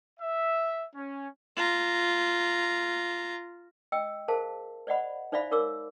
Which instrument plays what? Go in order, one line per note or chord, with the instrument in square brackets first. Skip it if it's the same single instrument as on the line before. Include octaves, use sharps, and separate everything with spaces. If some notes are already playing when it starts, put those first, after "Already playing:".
[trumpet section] E5
C#4
[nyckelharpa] F4 A#5
[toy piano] D#5 G5 E6
G#4 A#4 C5 F5 A5
C5 D5 D#5 F#5 B5
D#4 C5 D5 E5 F5 B5
D#4 A#4 C#5 D6 E6